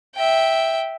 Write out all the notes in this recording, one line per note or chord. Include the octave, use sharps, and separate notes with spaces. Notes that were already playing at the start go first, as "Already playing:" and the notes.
E5 G5